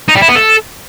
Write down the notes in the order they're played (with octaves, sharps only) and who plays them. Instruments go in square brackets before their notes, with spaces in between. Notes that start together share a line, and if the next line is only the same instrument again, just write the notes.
[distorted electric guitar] D#4
G3
E4
B3
A4